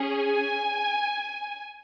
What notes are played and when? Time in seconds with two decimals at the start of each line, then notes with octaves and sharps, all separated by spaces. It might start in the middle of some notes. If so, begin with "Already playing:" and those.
Already playing: C#4 G#4
0.18 G#5